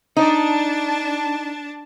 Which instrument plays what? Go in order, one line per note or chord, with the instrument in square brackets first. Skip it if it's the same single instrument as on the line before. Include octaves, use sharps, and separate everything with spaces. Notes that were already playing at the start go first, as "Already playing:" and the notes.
[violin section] D4 A5 [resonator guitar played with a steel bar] D#4